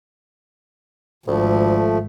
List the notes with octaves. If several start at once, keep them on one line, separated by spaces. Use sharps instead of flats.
G#1 D2 F3 A3